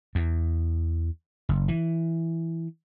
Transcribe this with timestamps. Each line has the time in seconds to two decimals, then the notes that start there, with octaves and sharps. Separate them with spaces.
0.15 E2
1.49 F#1
1.68 E3